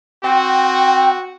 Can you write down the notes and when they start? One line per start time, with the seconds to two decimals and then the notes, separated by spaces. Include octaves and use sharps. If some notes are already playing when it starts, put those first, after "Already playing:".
0.24 C4 F#4 G5